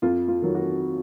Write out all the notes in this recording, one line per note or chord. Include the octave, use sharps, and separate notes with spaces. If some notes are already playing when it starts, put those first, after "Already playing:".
F2 F4
F4
D#3 F#3
F#4